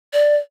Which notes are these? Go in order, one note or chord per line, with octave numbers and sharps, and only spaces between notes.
D5